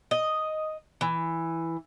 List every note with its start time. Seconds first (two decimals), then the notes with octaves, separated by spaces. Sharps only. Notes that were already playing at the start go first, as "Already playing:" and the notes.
0.11 D#5
1.01 E3